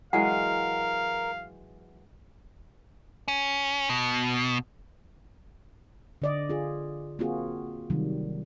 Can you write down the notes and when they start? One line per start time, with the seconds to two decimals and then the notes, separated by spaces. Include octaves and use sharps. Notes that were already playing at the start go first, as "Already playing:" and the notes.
0.13 E3 F#3 G#3 A#4 F5 F#5
3.28 C#4
3.90 B2
6.22 D3 D5 D#5
6.49 F4 G#4
7.19 A#3 C4 F4 F#4 G#4
7.90 C3 D#3 F#3 G3